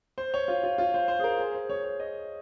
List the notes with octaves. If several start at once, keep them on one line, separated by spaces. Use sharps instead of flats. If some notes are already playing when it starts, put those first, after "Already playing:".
C5
C#5
F4
F4
F4
C5
C5
G#4
A#4
G#4
C5
C#5
C#5
D#5